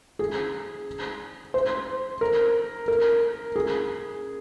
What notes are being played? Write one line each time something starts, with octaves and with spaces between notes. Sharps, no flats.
G#4
C5
A#4
A#4
G#4